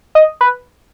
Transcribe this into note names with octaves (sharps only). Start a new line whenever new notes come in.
D#5
B4